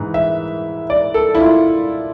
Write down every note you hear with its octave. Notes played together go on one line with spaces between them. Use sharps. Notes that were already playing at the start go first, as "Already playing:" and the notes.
Already playing: G#2 E3
E5
D5
A4
E4
F4